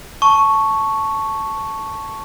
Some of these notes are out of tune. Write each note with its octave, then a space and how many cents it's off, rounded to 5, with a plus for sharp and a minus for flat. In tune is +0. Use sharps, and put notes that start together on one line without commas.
A5 +0 C#6 +0